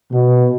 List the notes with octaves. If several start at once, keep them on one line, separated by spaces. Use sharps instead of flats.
B2